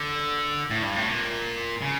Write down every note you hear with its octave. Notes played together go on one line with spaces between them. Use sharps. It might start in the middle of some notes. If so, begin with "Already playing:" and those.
Already playing: D3
A2
G2
A2
A#2
C#3